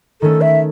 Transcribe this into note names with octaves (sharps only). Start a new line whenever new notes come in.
D#3 A3 C#4 A4
E5